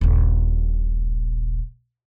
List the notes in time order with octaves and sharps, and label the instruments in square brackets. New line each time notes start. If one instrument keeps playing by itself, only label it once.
[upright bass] D#1 A#1